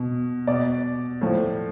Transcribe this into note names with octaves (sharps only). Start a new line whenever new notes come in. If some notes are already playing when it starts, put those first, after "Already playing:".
Already playing: B2
B2 D5
A2 F3